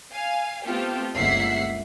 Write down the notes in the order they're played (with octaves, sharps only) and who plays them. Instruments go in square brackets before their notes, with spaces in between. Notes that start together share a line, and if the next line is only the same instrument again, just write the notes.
[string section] F5 G#5
A3 B3 C4 F4 G4 A4
G1 C#2 A#3 E5 F#5 C7